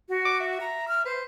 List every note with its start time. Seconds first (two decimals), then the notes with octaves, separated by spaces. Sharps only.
0.09 F#4
0.25 D6
0.40 E5
0.60 A#5
0.88 F6
1.06 B4 C5